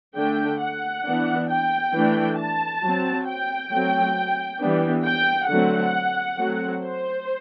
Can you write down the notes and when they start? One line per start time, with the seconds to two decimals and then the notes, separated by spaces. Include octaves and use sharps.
0.16 D3 A3 D4 G5
0.60 F#5
1.04 E3 B3 D4
1.49 G5
1.93 E3 A3 D4
2.38 A5
2.83 F#3 C4
3.27 G5
3.71 F#3 A3 C4
4.60 E3 G3 B3 D4
5.04 G5
5.49 D3 F#3 A3 C4 F#5
6.38 F#3 A3 C4
6.82 C5